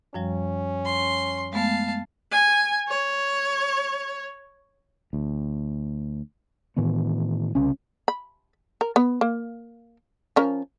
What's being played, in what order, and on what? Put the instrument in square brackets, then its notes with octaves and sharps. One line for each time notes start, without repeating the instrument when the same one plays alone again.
[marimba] F#2 F3 G3 [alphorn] C#4
[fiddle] C6
[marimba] G#3 A3 B3 [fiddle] F5 A5
[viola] G#5
C#5
[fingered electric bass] D2
A2 D#3 E3 B3
C2 C#3 C#4
[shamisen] B5
A#4
B3
A#3
F3 C#4 A#4